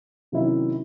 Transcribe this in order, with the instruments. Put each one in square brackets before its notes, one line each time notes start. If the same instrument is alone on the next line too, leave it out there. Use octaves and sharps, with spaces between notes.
[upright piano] C3 D#3 F#3 C#4 E4